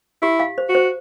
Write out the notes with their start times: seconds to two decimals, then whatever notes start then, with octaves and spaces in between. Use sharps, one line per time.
0.22 E4 G4
0.40 F5
0.58 C5
0.69 F#4
0.75 C5